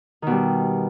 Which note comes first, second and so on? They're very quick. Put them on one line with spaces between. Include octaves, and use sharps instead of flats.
D#3 B2 G3